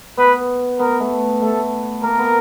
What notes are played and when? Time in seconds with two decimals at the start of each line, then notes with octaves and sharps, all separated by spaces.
0.18 B3 B4
0.79 B3 A#4
1.00 A3
1.42 A3 A4
2.03 A#3 A#4
2.19 B3